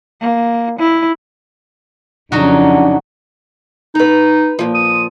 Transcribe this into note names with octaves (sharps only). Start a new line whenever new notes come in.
A#3
E4
F2 C#3 F#3 D4 D#4 F#4
D#4 B4 A#5
A#2 F3
D#6